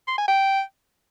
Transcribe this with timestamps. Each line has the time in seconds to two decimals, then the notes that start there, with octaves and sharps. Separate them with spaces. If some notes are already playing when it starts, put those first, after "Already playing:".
0.08 C6
0.18 G#5
0.28 G5